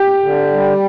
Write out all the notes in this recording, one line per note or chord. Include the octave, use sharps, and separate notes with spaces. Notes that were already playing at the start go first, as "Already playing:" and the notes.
Already playing: G4
D3
G3